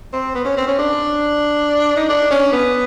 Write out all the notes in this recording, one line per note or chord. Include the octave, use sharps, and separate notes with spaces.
C4
B3
C#4
C4
C#4
D4
D#4
D4
C#4
B3